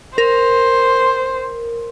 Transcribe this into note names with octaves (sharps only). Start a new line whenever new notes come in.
A#4 C5